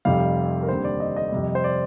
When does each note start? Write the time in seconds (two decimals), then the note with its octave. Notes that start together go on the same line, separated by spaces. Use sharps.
0.05 F1 F2 C3 G3 F5
0.62 A#4
0.68 D#2 D3 G3 C4 C5
0.84 D5
1.00 D#5
1.16 D#5
1.32 F2 C3 G3
1.55 C5
1.64 D5